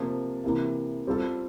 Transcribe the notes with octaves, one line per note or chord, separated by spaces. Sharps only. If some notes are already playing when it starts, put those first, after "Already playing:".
Already playing: C3 F3 A#3
C3 E3 A#3
G3 C4 F4 A4